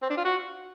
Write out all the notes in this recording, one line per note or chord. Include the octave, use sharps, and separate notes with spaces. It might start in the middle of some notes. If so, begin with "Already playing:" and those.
C4
D4
F4
F#4